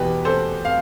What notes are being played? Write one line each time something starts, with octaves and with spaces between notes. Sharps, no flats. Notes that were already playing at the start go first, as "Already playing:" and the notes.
Already playing: E2 B2 G4 B4
A4 C5
F5